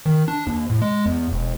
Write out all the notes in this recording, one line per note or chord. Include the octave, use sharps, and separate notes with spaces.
D#3
D4
D#2
A2
G#3
E2
E1